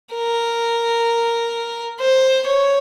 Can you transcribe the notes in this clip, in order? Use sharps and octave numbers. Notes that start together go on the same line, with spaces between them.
A#4
C5
C#5